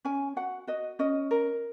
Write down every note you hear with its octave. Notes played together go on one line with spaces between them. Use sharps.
C#4 G#5
F#4 F#5
F#4 D#5
C#4 D#5
A#4